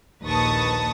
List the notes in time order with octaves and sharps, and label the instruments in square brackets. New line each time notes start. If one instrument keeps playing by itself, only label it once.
[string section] A#1 D#2 B4 A5 C#6 D#6